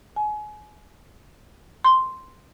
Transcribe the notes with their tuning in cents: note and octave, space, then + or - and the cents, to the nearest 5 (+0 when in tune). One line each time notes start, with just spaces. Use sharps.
G#5 +30
C6 -5